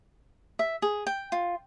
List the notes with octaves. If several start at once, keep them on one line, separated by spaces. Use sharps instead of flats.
E5
G#4
G5
F4